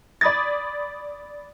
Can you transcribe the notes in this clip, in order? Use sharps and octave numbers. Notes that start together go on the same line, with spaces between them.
D5 B5 D#6 G#6 A6